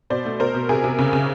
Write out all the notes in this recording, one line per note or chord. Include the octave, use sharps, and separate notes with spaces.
B2 C5 D5
A3
B2 A#4 C5
B2
C3 G#4 A#4
C3
C#3
C#3